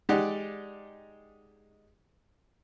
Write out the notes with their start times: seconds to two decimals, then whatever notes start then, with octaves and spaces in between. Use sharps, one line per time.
0.09 G#3 D#4 G4 D5 F#5